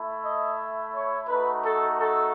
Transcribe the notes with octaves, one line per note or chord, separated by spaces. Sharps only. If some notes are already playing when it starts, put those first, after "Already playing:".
Already playing: A3 E4
D#5
C#5
A3 D#4 F#4 B4
A4
A4